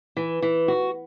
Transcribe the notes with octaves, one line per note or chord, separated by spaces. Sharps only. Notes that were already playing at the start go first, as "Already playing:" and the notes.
E3
E3
F#4